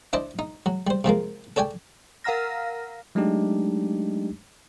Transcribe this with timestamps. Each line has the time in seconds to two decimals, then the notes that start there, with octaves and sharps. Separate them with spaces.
0.13 D4 E4 C5 D5 D#5 A5
0.39 D#4
0.66 F#3
0.87 G3 C5
1.04 C3 F3 G#3 A#3
1.56 A4 C#5 D5 G5 G#5
2.24 A#4 F5 F#5 A#5 F6 A#6
3.15 F#3 G#3 A3 D4 D#4 G4